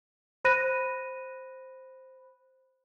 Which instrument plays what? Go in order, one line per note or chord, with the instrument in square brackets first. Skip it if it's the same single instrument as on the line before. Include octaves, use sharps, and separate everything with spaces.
[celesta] C5 B5 F#6 A#6 D#7